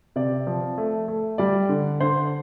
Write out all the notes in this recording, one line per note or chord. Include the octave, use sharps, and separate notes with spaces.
C3 D5
F3
A3
A3
G3 D5
D3
D3 C5